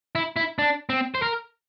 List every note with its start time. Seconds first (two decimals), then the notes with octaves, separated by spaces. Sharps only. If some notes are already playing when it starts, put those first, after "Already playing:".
0.15 E4
0.36 E4
0.59 D4
0.90 C4
1.15 C5
1.22 A#4